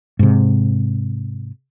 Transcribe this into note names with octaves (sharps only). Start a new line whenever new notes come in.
G#2 C3